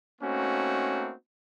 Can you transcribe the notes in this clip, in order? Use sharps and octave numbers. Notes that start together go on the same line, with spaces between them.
A3 A#3 C4 C#4 D#4 F#4